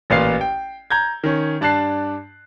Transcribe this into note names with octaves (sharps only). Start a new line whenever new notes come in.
A1 A#2 B4 F5 C7
G5
A#5 G6 G#6
D#3 C#4
G2 D4 A5 F#6 C7